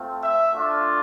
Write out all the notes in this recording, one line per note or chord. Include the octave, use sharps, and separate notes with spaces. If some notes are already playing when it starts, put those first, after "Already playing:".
Already playing: A3 C4 F4
E5
A3 D4 F4